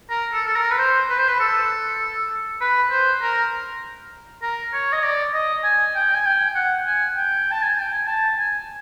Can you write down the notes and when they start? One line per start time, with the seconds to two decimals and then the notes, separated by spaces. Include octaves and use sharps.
0.10 A#4
0.33 A4
0.46 A4
0.56 A#4
0.71 B4
0.78 C5
1.09 B4
1.18 C5
1.28 B4
1.40 A4
2.61 B4
2.90 C5
3.22 A#4
4.42 A#4
4.73 C#5
4.93 D#5
5.03 D5
5.34 D#5
5.64 G#5
5.95 G5
6.14 G#5
6.25 G5
6.55 F#5
6.86 G#5
7.16 G5
7.51 A5
7.62 G#5
7.79 G5
7.93 G#5
8.07 A5
8.37 G#5